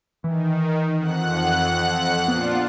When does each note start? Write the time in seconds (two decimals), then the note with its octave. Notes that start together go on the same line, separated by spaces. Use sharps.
0.24 D#3 E3
0.97 F2 F#5 F#6
2.28 A#2 B3 D4 F4